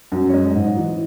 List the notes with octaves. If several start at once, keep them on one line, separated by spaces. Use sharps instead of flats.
F#2
C#5
G#3 D#5
G#2
E3